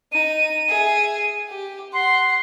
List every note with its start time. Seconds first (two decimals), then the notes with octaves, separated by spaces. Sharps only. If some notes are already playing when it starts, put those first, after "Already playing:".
0.13 D#4 D#7
0.69 G#4 E5
1.48 G4
1.93 F#5 C6